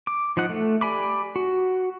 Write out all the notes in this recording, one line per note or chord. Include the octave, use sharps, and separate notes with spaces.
D6
F3 D#4 F#5
A3
G4 D5 G#5 B5 D6
F#4